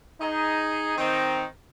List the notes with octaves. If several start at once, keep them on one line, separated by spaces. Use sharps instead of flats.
D#4 G#4
D#3 C4 D#4